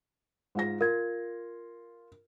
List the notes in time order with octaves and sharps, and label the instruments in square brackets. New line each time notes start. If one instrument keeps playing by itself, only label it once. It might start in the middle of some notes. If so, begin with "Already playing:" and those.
[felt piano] G#2 F4 A#6
[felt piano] F4 [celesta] A#4 G#6